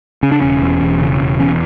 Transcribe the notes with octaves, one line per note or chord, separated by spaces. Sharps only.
C#3 C#4
D4
E1 C#4
E2
E1
C#3
E1
E2 C#4